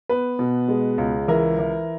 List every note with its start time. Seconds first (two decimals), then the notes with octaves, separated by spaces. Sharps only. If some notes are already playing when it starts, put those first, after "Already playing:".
0.09 B3 B4
0.39 B2
0.68 G#3
0.98 C#2
1.28 E3 A#4
1.59 E3